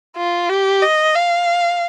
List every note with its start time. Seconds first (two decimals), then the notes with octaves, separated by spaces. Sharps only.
0.17 F4
0.50 G4
0.82 D#5
1.15 F5